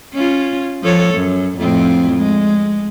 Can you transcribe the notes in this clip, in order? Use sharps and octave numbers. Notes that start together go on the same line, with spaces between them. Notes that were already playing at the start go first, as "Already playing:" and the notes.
C#4 F4
F3 A4 C#5
F#2
F2 A2 C4
G#3